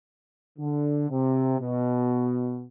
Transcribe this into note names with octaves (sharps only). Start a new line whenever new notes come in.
D3
C3
B2